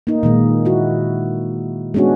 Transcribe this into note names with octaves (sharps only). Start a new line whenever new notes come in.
A#3 D#4
A#2 D#3 G#3
E4 F#4
G#3 B3 C#4 D4 F#4